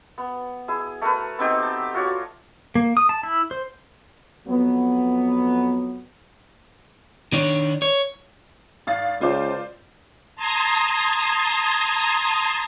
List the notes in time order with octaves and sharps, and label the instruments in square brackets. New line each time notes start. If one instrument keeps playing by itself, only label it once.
[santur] B3
E4 G#4
A3 A#4 B4
B3 C4 D#4 G4
A5
F4 F#4 C#5 D5
[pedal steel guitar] A#3
D#6
A5
E4
C5
[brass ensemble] F2 F#3 B3
[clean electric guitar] D#3 D4 C#5
C#5
[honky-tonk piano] G#1 F5 A6
[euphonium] C#2 [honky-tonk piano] F4 C5 D5
[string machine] A5 A#5 C6 D#6 G#6